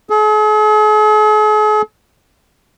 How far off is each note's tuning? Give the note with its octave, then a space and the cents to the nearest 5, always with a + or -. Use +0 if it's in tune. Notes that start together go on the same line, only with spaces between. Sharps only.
G#4 +45